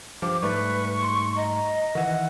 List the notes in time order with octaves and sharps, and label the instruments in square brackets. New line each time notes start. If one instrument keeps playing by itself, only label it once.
[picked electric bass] G2 F3 [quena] D6
[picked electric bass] G#2 G3 A3 [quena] B4 [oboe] C#6
[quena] C6
[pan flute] D#5 [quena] A#5
[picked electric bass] D#3 E3 [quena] F#5